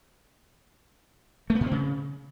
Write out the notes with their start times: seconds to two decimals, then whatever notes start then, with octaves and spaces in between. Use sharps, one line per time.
1.50 A3
1.55 B3
1.61 A2
1.66 C4
1.71 C#3